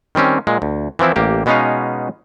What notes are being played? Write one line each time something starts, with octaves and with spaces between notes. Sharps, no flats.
D#3 G3 C4 C#4
A#2 G#3
D2
E3 F3 C4 E4
A1 A#3 G4
B2 G#3 B3 C#4 D#4 F5